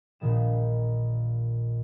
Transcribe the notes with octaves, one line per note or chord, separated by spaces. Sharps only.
A#1 A#2 D#3 G3 E7